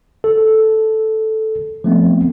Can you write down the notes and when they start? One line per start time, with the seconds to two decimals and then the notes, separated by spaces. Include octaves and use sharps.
0.24 A4
1.84 F3 A3 B3 C4